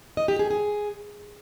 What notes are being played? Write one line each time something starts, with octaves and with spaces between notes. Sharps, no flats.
D#5
G4
G#4
G#4